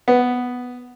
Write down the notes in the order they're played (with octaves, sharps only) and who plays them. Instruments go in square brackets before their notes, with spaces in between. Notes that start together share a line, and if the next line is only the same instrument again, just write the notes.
[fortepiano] B3